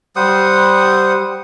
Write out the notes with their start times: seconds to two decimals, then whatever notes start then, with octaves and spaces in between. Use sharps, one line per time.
0.16 G3 C5 F#5 D#6